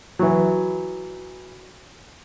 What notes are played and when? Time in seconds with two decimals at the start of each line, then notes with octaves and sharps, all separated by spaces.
0.19 E3 F#3